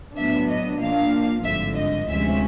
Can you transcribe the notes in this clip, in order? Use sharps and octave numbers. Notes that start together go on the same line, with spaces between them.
A2 F#3 B3 D4 E5
D#5
A#2 F3 A#3 D4 F5
G#1 G2 D3 F3 E5
D#5
D2 C3 F3 G#3 C#4 E5